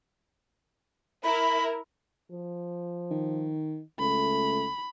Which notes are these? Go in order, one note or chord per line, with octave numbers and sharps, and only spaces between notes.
E4 A#4 B5
F3
D#3
C#2 A3 B5